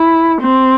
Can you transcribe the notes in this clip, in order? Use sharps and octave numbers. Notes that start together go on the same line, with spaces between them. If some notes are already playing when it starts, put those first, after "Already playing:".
Already playing: E4
C4